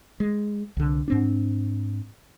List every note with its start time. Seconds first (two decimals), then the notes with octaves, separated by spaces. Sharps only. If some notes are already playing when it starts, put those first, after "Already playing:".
0.20 G#3
0.77 C2 D3
1.08 G#2 C4 D4